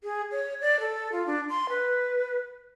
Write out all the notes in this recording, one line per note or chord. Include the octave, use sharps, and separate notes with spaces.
G#4
C#5
D5
A4
F4
D4
C6
B4